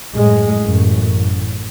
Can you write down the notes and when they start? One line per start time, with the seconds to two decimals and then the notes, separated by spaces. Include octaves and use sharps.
0.15 F#2 A2 G#3
0.61 A1 F#2